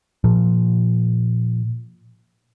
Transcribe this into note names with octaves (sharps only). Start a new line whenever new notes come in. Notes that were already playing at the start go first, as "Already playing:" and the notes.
A#2 F3